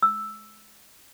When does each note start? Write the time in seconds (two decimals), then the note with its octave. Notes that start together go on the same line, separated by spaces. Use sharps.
0.03 E6